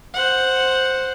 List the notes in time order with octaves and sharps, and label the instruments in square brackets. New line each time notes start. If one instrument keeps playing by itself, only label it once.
[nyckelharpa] C5 F#5